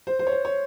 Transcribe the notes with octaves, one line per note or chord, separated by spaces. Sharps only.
C5
C5
C#5
C5
C#5